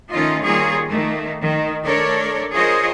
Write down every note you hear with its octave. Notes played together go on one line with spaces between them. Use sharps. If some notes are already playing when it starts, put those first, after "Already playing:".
D#3 A3 C#4 D#4 F4 D#5
D#3 G3 A#3 F4 G#4 C#5
D#3 A3 A#3
D#3
A3 D4 A4 A#4 C#5 D5
F4 G#4 A#4 C5 C#5 D#5